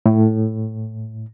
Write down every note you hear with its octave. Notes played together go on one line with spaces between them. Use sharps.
A2